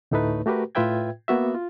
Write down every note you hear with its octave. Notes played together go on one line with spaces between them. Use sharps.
D2 A2 A3 D#4 B4
A3 F#4 G4 A#4 B4
A2 F4 B4 E5 G5 G#6
A#3 B3 F#4 E5
F4